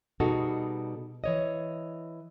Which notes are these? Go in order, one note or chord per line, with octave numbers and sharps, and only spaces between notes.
B2 G3 D#4 F#4 G#4 A4
E3 C#5 D#5